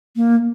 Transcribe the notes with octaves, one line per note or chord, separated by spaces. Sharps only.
A#3